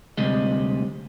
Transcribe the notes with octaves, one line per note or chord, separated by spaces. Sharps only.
D2 C3 G3 G#3 D#5